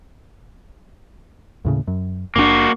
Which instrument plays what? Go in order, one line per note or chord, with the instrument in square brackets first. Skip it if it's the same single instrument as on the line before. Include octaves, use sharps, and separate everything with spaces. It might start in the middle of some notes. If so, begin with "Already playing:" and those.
[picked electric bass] D#2 A2 C#3
F#2
[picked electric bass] F#1 C3 D4 [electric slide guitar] A#3 F#4